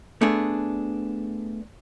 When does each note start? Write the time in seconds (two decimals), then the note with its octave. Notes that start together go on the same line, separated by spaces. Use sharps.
0.21 A3 B3 D4 G#4